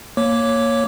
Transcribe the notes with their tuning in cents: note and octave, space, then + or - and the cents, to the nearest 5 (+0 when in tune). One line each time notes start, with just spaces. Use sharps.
A#3 +0 C#5 +0 D6 -10